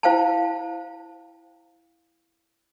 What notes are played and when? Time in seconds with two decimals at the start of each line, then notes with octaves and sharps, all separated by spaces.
0.03 E4 C5 F5 G5 A5